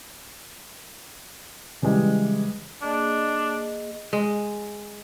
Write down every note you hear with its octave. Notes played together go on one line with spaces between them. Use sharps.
C#3 E3 G3 G#3
A#3 D4 G#4 D#5
G#3